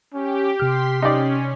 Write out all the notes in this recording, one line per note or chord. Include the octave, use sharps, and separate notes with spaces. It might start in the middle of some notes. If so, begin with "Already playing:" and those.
C#4 G4
C3 G4 C6 F6 B6
C#4 D#4 G4 D5